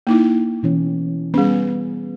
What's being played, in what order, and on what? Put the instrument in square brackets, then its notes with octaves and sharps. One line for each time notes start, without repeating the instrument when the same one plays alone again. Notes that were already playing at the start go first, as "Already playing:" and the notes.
[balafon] A#3 D#4 E4
[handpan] B2 E3 C#4
[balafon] G3 C#4 [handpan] B3 G#4